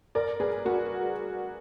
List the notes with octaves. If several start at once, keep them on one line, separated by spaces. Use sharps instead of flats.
A#4 D5
G#4 B4
F#4 A#4